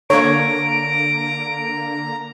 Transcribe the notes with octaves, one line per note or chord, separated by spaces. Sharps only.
D3 A#3 C#5 A#5 D7